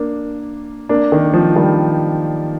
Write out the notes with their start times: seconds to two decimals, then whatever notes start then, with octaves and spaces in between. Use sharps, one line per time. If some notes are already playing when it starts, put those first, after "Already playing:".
Already playing: A#3 D4
0.89 A#3 D4
1.12 D#3
1.34 F3
1.56 D#3 G3